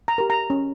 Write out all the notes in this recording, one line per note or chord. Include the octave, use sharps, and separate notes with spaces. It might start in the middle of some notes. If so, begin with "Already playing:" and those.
A#5
G4 A#4
A#5
C#4